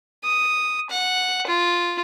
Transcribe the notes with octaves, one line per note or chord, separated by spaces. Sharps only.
D#6
F#5
F4